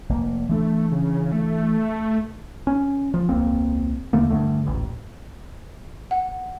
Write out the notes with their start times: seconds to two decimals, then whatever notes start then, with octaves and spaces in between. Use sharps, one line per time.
0.09 F1 A#3
0.49 E3 A3 D4
0.91 C#3
1.32 A3
2.67 C#4
3.14 F3
3.29 E1 C#2 A#3 C4
4.13 D#2 D3 A3 A#3
4.30 G2 D3 A3
4.65 D#1 A1
6.11 F#5